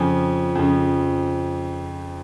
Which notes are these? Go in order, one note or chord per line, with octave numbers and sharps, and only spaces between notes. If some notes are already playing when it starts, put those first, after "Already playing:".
Already playing: F2 C#3 F3 G#5
F2 C#3 F3